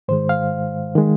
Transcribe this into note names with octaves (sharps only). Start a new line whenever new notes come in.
G#2 D#3 G#3 C5
F5
D#3 G#3